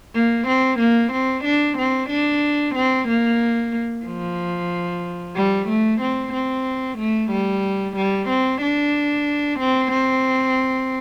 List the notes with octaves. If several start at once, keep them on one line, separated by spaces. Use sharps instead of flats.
A#3
C4
A#3
C4
D4
C4
D4
C4
A#3
F3
G3
A3
C4
C4
A3
G3
G3
C4
D4
C4
C4